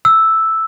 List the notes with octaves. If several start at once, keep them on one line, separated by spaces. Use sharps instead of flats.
E6